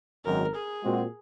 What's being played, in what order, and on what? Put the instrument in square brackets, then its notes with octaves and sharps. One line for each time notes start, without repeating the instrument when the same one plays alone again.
[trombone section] G#1 F#2 D#3 F#3 [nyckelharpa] A#4
[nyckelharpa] G#4
[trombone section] A#2 G#3 C4 F#4